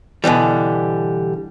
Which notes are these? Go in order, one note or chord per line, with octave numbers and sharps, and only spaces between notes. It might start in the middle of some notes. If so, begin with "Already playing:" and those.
B2 D3 E3 G3